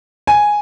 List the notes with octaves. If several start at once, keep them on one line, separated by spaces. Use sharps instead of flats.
G#5